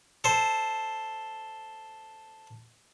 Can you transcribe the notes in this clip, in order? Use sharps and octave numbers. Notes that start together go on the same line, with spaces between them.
A4 C5